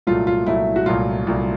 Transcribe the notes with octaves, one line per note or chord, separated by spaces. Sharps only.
C2 A#2 F#3 A3 F4
F4
C2 A#2 F#3 A3 E4
F#4
C2 A#2 F#3 A3 F4
C2 A#2 F#3 A3